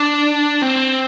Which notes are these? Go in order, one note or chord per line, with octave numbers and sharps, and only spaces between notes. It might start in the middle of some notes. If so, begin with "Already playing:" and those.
Already playing: D4
C4